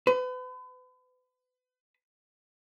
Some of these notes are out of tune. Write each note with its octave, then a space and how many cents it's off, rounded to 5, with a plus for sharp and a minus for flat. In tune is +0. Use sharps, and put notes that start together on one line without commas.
B4 +40